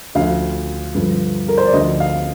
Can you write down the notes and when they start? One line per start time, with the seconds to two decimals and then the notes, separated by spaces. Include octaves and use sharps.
0.15 D2 D3 F3 F5
0.94 G2 D3 F3
1.48 A#4
1.58 C5
1.65 D5
1.73 D2 D3 F3 D#5
2.00 F5